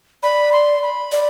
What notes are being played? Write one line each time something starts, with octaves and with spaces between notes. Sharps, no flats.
D5 B5
C6
B5
D5